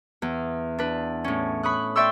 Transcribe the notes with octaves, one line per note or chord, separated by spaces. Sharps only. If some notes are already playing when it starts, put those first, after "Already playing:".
E2
D4 B4
A2 C#4
B5 C#6 D#6 F#6
D5 E5 G5 C6 C#6 E6